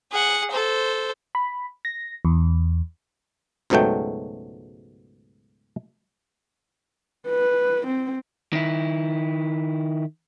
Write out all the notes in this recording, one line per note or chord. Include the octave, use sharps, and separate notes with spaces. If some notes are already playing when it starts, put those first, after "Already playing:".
G#4 F#5
A4 C5
B5
A#6
E2
C#2 G#2 B2 F#3 A3 G5
B4
C4
D#3 E4